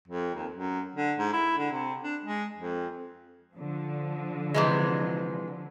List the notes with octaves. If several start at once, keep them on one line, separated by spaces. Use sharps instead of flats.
F2
D#2
F#2
D3
G#2
E4
D3
C3
D4
G#3
F2
D3 F3
C3 E3 G#3